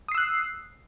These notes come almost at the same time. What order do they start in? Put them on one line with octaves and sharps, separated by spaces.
D#6 C7 E6 F#6